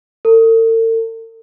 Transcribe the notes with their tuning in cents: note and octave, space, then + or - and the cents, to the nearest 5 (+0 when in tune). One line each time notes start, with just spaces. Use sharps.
A4 +45